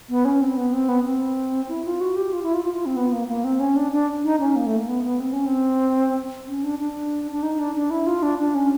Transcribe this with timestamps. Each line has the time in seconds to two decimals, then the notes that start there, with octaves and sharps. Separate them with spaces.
0.09 B3
0.25 C#4
0.41 C4
0.57 B3
0.73 C4
0.89 B3
1.05 C4
1.69 E4
1.85 F4
2.01 F#4
2.16 G4
2.33 F4
2.43 E4
2.54 F4
2.65 F4
2.75 F4
2.86 C4
2.96 B3
3.12 A#3
3.28 A#3
3.44 C4
3.60 C#4
3.76 D4
3.92 D4
4.24 D#4
4.40 C#4
4.56 A#3
4.67 A3
4.77 A#3
4.88 B3
5.04 B3
5.20 C4
5.33 C#4
5.46 C4
6.48 C#4
6.63 D4
6.79 D4
7.32 D4
7.43 D#4
7.59 D4
7.75 D4
7.90 E4
8.07 F4
8.23 D4
8.39 D4
8.55 C#4